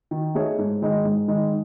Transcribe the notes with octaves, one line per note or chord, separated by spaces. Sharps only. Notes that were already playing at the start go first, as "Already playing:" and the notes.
D#3
A3 D#4 G#4 C#5
G#2
D#3 G#3 D#4
G#2
D#3 G#3 D#4